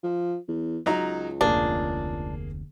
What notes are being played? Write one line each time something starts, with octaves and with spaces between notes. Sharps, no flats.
F3
E2
C#2 F#3 D#4 A#5
F1 D2 A#3 D4 G#4